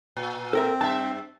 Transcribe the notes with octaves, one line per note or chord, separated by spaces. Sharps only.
A#2
C4 A4 A#4 E5
G2 E5 A5